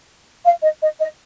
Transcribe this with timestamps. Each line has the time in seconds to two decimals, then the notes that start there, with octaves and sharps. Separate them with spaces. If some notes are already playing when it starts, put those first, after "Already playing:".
0.45 F5
0.64 D#5
0.81 D#5
0.99 D#5